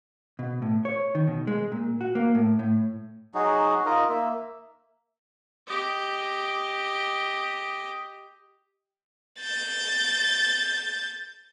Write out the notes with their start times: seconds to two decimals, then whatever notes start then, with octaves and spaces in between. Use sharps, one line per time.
0.39 B2
0.62 A2
0.85 C#5
1.15 D#3
1.28 B2
1.47 G#3
1.72 A#2
2.01 F#4
2.15 A#3
2.35 A2
2.59 A2
3.34 F#3 D#4 F#4 G#4
3.86 D#4 F4 A#4 D#5
4.09 A#3 E5
5.67 G4 D#5
9.40 G6 A6